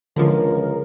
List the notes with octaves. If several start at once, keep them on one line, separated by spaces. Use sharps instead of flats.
C#2 D3 E3 F3 A#4